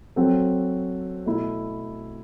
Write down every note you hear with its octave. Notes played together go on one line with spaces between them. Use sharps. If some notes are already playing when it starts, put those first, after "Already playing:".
F#3 C4 F#4 A4
B2 A3 E4